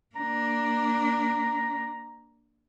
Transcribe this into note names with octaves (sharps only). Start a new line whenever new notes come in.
A#3 D4 A#5